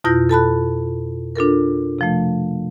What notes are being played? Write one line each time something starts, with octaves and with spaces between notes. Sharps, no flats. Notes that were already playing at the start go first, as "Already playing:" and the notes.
F2 B2 E4 F4 G6 A#6
A4 A5 B5 F#6
D4 F4 A4 A#4
C3 F3 A3